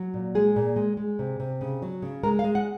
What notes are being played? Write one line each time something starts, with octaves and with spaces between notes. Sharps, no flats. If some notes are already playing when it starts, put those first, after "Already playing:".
Already playing: F#3
A#2
G#3 G#4
A#2
G#3
G#3
C3
C3
C#3
F#3
C#3
G#3 A#4
F5
G#3
F#5